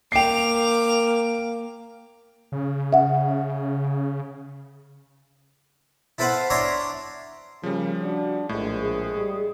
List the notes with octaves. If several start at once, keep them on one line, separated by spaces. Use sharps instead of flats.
A#3 G5 D6 C7 F7
C#3
E5 F#5
E4 A4 B4 C5 F5 F#5
D4 C#5 E5 A#5 C6 C#6
C#3 F3 G3 A#3
D4 F#4
A#1 A2 G#3
G#4
G3